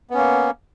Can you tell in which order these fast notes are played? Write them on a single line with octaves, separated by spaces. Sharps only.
B3 C#4 A#3